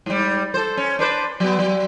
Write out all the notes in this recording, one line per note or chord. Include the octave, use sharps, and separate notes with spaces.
G#2 G3
A4 C5
C#4
D4 B4 C5
F#3 B3
F#3